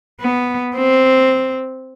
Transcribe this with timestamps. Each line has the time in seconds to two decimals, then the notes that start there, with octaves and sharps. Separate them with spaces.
0.21 B3
0.76 C4